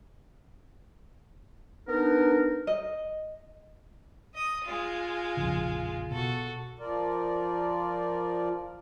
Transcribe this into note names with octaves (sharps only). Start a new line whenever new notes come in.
B3 D4 D#4 A#4
D#5
D#5 D#6
G#3 F4
A#1 F2 C#3
B2 F#4 A4
F3 F4 A#4 D5